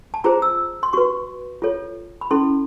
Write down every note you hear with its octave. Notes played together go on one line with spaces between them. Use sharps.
A5
F4 G#4 C5 A#5
E6
C6
F#4 B4 C#6
F4 A4 C#5
B5
C#4 E4 A4 C6